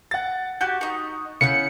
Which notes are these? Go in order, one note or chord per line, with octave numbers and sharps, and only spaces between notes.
F#5 A6
F#4 G4 G6
D#4 C#6
C#3 E4 F#5 G6 C#7